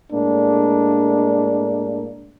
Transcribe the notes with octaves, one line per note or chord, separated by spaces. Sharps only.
A2 G#3 A#3 D4